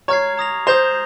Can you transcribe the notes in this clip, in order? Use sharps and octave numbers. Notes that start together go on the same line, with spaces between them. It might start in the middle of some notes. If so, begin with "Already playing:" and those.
C#5 A#5 F6 G#6 C7
A#5 D#6 A#6 F7
C5 D#6 G6 A#6 F7